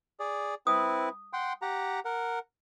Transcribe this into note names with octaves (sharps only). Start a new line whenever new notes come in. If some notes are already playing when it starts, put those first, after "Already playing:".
G#4 D5
C4 E4 B4 D#6
F#5 G5 C6
G4 F#5 A#5
A#4 F#5